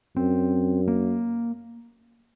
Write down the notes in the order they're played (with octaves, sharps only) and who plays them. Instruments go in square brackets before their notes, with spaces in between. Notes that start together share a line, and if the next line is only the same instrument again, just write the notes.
[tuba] F#2 [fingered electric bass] C4
[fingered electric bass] A#3